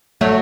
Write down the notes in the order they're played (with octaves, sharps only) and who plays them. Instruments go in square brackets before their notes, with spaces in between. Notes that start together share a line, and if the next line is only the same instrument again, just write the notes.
[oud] F#3 [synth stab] A3